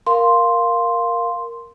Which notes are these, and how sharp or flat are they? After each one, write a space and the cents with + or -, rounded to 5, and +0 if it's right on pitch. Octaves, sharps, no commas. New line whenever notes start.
A#4 +0 F5 +0 C6 +0